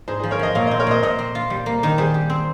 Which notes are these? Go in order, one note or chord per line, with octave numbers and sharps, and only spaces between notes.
G#2 G#4 C5
G#4 C5
F3
A#4 C#5
F3 C5 D#5
A#2 C#5 F5
C5 D#5
C4
A#4 C#5
A#2 C5 D#5
A#2 C5 D#5
C4
F4
G3
A#3
D#3
G3 G#4 C5
G4
C4